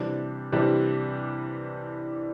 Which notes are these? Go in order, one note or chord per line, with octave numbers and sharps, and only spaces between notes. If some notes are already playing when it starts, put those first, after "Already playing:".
Already playing: C3 E3 G3 D4 G4
C3 E3 G3 D4 G4